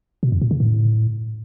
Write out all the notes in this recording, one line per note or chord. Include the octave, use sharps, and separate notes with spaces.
B2
F2
A#2
C#3
A2